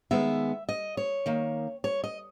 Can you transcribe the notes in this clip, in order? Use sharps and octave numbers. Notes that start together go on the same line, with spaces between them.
D#3 G#3 B3 E5
D#5
C#5
D#3 A#3
C#5
D#5